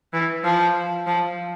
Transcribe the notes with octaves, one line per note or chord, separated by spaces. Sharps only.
E3
F3
F3